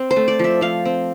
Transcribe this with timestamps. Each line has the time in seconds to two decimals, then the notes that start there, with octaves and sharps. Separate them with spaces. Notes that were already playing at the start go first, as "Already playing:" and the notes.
Already playing: C4
0.11 C5
0.16 A3
0.28 D5
0.39 F3 E5
0.61 F3 F5
0.85 C4